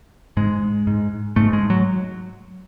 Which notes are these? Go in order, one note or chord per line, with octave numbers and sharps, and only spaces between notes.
G#2 G#3
G#2
G#2 A3
G#3
F#3